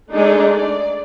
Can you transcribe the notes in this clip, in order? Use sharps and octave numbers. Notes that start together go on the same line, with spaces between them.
G#3 A3 D4 D#4 G#4 A4
D5